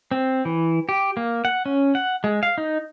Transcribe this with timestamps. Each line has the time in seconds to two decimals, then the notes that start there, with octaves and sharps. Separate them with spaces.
0.11 C4
0.45 E3
0.89 G4
1.17 A#3
1.45 F#5
1.66 C#4
1.95 F#5
2.24 G#3
2.43 F5
2.58 D#4